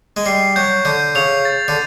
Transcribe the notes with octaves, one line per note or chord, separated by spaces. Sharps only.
G#3
G3 C7
F#3 G6
D3 G6
C#3 F7
A6
D3